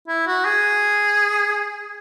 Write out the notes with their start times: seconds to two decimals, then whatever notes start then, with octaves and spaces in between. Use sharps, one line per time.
0.08 E4
0.27 F#4
0.45 G#4